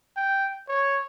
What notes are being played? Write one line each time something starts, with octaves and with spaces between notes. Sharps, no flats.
G5
C#5